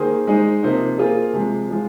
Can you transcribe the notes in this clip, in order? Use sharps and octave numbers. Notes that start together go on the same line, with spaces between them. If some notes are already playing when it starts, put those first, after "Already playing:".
Already playing: D#3 A#3 G#4 C5
G#3 D#4 C5
C3 F3 A#3 D#4 C5
A#3 F4 G#4 C5
C3 F3 G#3
F3 G#3 F4